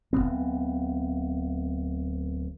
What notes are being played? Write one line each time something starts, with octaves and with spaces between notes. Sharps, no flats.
D1 A#2 B3 C4